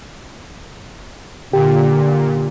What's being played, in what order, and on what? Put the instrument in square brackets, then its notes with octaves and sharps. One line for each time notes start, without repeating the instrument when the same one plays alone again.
[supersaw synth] A#2 [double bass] D3 [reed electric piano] G4